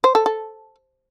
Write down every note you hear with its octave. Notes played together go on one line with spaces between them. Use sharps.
C5
A4
A4